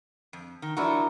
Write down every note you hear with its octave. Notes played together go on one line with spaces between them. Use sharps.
F2
D#3
F3 F#3 D4 E4 F#4 A#4